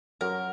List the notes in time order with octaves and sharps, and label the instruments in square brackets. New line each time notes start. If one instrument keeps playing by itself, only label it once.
[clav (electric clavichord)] F#2 F#3 [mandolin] A#4